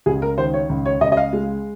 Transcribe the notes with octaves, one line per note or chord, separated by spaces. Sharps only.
C#2 G#4
A#4
D#3 C5
C#5
C#2
C#5
C#2 D#5
D#5
F5
G#3